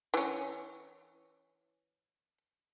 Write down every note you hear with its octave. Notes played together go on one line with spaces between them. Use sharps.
E3 C#4